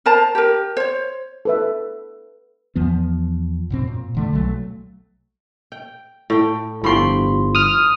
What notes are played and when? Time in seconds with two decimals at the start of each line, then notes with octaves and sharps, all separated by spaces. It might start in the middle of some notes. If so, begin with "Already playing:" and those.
0.06 A#4 C5 A5 A#5
0.35 G4 A#4
0.77 C5 C#5
1.45 A4 B4 E5
2.75 E2 F3 B3
3.70 F#2 B2 C4
3.87 A#2
4.15 F1 D3 A3
4.33 B1 F#3 A3
5.72 G5
6.30 A2 G5
6.84 G1 A2 F3 G5 B5 C6
7.55 D#6 F6